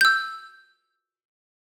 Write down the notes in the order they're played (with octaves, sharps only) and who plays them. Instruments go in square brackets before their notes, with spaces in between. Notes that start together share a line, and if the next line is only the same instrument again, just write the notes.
[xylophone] E6 G6